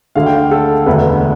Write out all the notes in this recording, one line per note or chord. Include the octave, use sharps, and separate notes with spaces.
D2 D3 A3 D4 F5
G5
F5
A4
E1 D2 D3 B4